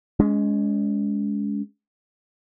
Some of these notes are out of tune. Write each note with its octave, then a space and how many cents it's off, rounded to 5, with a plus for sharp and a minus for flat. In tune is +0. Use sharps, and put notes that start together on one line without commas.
G#3 +0 C#4 +35